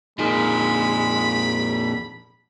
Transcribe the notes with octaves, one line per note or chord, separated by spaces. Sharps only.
F2 A#2 G#3 D#4 G#4 A#4 B5